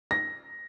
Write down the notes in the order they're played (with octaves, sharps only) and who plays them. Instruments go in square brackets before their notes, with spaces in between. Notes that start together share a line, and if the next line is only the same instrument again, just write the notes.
[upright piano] A#6